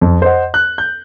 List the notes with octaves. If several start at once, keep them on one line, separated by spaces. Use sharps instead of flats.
F2
C5 D#5 F#5
F#6
G6